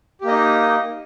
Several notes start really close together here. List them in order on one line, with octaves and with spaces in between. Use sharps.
G4 A#3 D#5 D#4